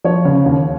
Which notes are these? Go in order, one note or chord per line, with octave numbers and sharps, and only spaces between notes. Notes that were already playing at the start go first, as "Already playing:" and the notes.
F3 C#5
C#3
D#2